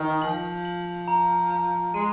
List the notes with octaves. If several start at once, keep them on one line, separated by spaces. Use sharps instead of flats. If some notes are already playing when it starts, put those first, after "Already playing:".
Already playing: D#3
F3 F#7
F#7
A#5
A#5
G#3 D#7